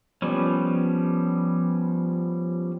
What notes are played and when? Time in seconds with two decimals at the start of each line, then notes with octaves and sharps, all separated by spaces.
0.22 F3 G3 B3 C#4